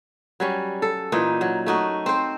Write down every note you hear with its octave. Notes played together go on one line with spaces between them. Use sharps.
F#3 G3 C#4
A4
A#2 E3 D#4
F#3
A3 D#4 F#4
C4 C5